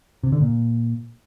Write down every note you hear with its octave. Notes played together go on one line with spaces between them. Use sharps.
C3
D3
A#2